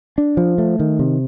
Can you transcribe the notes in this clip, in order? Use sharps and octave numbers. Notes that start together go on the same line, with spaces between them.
D4
F3
A3
D#3
C3